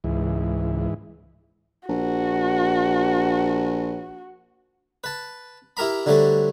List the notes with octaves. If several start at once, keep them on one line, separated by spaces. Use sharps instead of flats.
C#2 G#2 E3
A#1 F#4
B4 A5
E4 G4 A#4 A#5 B5
D3 F#3 G3 A3 C5